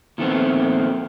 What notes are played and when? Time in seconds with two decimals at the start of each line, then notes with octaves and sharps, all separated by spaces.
0.18 A#2 D#3 F3 A3 B3 C4